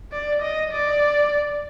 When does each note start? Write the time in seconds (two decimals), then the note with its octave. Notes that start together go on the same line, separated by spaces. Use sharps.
0.12 D5
0.42 D#5
0.72 D5